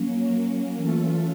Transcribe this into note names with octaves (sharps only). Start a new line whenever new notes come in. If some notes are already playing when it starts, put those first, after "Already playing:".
Already playing: F#3 A#3 C#4
E3 A3 C#4 F4 A4